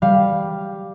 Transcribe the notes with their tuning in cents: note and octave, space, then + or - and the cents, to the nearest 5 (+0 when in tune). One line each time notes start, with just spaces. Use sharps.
G3 +0 F5 +0